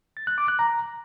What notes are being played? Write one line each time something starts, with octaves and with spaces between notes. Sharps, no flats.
A6
F#6
D6
F#6
A#5